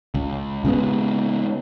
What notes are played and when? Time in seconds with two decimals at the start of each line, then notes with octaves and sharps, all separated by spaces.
0.14 C#2
0.65 C#3 G#3 B3